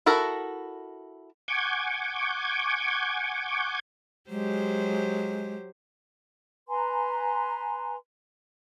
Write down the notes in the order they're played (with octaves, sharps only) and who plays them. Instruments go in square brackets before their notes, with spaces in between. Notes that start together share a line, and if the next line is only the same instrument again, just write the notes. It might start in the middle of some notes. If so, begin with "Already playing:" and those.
[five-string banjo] E4 F#4 A4 A#4
[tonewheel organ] F#5 G#5 C#6 D6 G6 G#6
[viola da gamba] F#3 G4 C5 [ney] G#3
[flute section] B4 G#5 A#5 C6